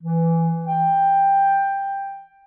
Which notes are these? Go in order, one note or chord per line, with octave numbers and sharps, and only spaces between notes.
E3
G5